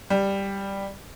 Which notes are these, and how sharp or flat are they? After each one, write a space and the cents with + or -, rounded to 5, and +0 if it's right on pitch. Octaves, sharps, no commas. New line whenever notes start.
G3 +5